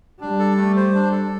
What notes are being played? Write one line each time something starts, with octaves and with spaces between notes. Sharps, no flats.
G3 D4
A4
A3
C5
D4
A4